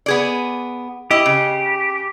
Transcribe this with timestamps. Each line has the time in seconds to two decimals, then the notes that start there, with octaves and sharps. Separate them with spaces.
0.06 B3 G#4 D5
1.11 E4 G4 D#5
1.26 C#3